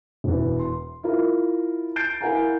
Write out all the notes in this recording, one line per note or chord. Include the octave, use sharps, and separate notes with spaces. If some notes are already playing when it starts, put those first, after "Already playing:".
E1 E2
C6
E4 F4 A#4
G6 A6 C7 D7
E4 A#4 F5 F#5 G#5 A#5